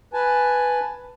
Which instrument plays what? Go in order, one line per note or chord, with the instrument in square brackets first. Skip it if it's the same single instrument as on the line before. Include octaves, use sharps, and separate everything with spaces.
[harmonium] B4 G#5 A5